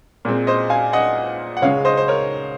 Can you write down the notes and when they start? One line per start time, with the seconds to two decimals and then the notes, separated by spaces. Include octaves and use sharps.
0.25 A#2 G#3 C4
0.47 C5 D#5
0.70 F5 G#5
0.93 D#5 F#5
1.57 F#5
1.62 C#2 C#3 G#3 C#5 F5
1.85 C5 D#5
1.97 C5
2.08 A#4 C#5